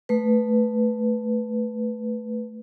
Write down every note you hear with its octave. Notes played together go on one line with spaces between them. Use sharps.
A3 B4